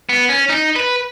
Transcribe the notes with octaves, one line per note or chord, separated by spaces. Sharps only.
B3
C#4
D#4
B4